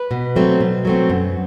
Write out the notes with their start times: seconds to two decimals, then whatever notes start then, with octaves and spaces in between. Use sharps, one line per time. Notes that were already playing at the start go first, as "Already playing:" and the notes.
Already playing: B4
0.11 B2
0.36 F#3 A3 C4
0.60 B2
0.85 F#3 A3 C4
1.10 F#2